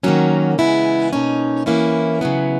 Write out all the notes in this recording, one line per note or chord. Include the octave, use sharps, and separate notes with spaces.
D#3 F#3 A#3 C#4 F#4
C#3 E3 G#3 B3 E4
B2 A#3 C#4 D#4
E3 A#3 C#4 E4
C#3 F#3 B3